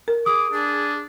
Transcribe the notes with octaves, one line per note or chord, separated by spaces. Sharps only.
A#4
G#4 D6 D#6
D4 G#4